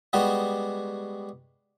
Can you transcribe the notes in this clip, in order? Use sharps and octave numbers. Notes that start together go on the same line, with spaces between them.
G3 G#3 B3 F#4 G4